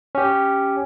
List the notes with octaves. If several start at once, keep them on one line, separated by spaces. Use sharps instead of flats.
C#4 G4